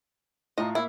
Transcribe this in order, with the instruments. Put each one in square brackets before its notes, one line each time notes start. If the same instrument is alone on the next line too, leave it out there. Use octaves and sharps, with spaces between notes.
[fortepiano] A2 F4 A#5 [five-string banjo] D#5
[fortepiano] A#3 [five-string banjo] E4